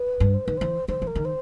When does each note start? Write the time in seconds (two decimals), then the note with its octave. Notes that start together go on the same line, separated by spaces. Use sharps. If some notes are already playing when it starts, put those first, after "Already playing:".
Already playing: B4
0.20 G2
0.34 C5
0.46 D#3 B4
0.57 E3 C5
0.88 D#3 C5
1.02 E3
1.07 A#4
1.15 D#3
1.25 C5